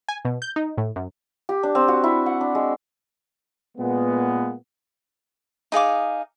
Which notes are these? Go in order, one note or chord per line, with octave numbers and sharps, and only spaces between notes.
G#5
B2
G6
D#4
A2
F#2
G4
D4
C4
F#4
E4
F#5
D4
G#3
A#2 G#3 A#3 B3
D#4 G#4 F5 D6